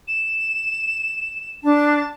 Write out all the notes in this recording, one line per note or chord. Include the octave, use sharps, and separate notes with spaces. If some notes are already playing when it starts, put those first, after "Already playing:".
E7
D4 A5